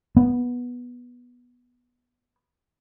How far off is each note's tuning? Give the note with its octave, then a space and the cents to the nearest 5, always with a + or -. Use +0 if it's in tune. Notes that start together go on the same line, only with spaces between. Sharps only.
B3 -10